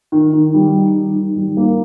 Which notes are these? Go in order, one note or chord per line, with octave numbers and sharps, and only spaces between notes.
D#3
D#3
G3
D#4
D#3
D#3
G3
A#3